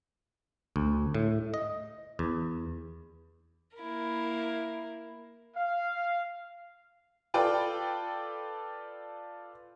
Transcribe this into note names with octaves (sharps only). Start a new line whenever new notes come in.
D2
A2
D#5
E2
A#3 E4 A#4
F5
F4 A4 B4 D5 G5